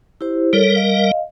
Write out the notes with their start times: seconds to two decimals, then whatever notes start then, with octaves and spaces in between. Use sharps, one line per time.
0.21 E4 G4 C5
0.53 G3 A4 A#4 C#5
0.76 D#5 F5